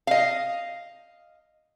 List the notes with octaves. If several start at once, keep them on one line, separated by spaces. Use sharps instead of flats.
D#5 F5